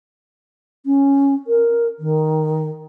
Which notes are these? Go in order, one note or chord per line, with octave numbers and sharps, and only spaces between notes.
C#4
A#4
D#3